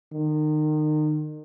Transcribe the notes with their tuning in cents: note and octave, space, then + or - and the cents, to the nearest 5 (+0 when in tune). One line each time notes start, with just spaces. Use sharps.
D#3 -30